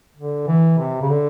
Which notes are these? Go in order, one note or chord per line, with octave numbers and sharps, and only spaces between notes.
D3
E3
C3
C#3
D3